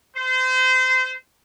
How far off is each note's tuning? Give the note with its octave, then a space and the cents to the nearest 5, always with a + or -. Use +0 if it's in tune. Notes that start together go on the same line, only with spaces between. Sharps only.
C5 -30